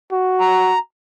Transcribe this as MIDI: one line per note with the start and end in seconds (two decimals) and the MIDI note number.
0.12 0.76 66
0.41 0.78 82